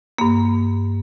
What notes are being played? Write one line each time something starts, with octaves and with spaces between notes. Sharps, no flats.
G2 A#3